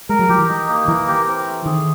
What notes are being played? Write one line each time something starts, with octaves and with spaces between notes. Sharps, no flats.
G#3 A#4
F#3
F3 G4
E3
D#4
A#3
E3 A#4
G4
C4
A3
D#3 G#4